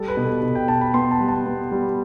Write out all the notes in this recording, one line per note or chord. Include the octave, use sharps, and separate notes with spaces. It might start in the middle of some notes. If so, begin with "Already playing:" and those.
Already playing: G3 A4
B4
B2
A4
B2
G5
B2 A5
B5
B3 C6
A5
G3
A5
B3
G3